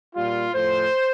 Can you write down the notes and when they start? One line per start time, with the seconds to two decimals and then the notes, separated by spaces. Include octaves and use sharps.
0.15 A#2 G3 F4
0.54 A2 F3 C5